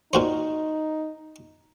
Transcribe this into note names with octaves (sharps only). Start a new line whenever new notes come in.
A#2 D#4 F#4 C5